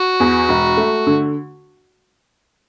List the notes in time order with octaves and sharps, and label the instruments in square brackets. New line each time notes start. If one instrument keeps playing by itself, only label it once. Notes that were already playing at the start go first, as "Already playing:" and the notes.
Already playing: [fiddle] F#4
[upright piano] E2
E1
A3
D3